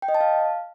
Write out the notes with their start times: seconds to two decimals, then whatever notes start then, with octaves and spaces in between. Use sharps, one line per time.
0.02 G5
0.08 D#5
0.15 A5
0.21 F5